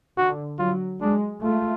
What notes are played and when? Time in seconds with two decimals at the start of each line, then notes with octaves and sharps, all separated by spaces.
0.17 D3 F#4
0.59 F#3 F4
1.01 G#3 D4
1.43 A3 F4